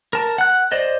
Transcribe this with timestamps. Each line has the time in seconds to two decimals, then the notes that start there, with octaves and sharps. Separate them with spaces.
0.13 A#4 A5
0.38 F#5 F#6
0.72 C5 D5 D#5